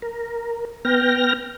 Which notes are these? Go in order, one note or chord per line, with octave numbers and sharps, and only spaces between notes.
A#4
B3 G5 F6 A#6